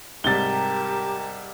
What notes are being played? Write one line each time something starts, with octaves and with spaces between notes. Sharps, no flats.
G#2 C3 G3 G4 A#4 A5 A6 G7